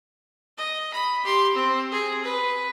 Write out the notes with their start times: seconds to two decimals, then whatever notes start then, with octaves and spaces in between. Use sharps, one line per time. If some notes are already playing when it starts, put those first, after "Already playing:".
0.58 D#5
0.93 B5
1.24 G4 C6
1.55 C4
1.92 G#4
2.24 B4